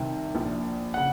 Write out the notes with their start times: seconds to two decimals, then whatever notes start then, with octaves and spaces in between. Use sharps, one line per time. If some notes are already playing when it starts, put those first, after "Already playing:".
Already playing: C2 C3 D#3
0.35 A#1 A#2
0.94 C#3 F#5